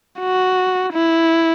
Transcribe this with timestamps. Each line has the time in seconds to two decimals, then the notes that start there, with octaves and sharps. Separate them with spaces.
0.20 F#4
0.93 E4